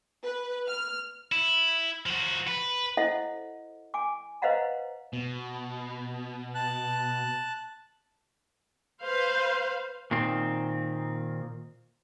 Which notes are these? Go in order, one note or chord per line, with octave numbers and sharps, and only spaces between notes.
B4
F6
E4
F3 F#4
B4
E4 A4 C5 D#5 E5 F#5
G#5 D6
B4 C5 D#5 F5 F#5 A#5
B2
A5 F#6
B4 C5 F5
A#2 D#3 C4